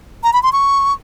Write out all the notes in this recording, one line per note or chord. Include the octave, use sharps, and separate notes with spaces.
A#5
B5
C6
C#6